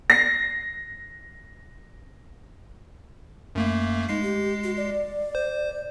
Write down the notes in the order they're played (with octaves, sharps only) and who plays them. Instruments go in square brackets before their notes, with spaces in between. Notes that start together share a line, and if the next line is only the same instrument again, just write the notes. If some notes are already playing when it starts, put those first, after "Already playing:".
[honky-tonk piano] A#6 C7
[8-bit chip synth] F#2 A3 A#3
[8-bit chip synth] G#3 C7 [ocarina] D#4
[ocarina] G4
F#4
D5
[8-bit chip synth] C5